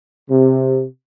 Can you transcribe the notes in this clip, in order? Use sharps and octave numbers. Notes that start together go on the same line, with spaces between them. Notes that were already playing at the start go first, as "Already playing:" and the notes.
C3